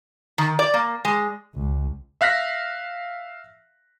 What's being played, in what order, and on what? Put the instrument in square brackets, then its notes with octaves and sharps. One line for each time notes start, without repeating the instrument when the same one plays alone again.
[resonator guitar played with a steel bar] D#3
D5
A#3
G#3
[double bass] C#2
[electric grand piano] E5 F5 F#6 A#6 B6